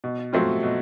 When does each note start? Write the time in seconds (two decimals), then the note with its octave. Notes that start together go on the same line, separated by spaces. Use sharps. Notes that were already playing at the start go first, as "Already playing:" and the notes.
0.04 B2
0.33 F#3 A3 C4 F4
0.63 B2